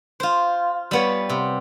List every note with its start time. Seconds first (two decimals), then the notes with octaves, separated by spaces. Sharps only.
0.20 F4 C5
0.91 G3 B3 C#5
1.30 C3